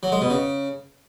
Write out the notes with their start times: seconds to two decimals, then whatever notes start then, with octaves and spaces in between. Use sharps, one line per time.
0.03 F#3
0.12 G#3
0.21 B2
0.30 C#3